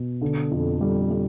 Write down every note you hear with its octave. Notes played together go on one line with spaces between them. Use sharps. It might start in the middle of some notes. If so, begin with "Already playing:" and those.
Already playing: B2
D3
F2
G3
G3